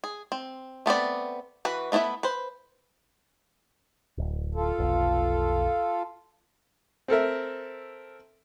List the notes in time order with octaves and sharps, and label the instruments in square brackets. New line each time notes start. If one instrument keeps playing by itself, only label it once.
[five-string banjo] G#4
C4
A3 B3 C4 D5
E3 F#4 B4
A3 B3 E4 F#4 E5
B4 C5
[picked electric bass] D1
[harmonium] F4 A4
[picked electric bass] F1 B1
[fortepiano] C4 A4 A#4 E5